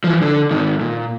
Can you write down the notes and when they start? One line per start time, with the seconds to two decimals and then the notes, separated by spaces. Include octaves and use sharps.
0.04 E3 F3
0.22 D3
0.51 G#2 D#3
0.81 A#2